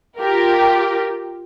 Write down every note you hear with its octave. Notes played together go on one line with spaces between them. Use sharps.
F4 G4 A#4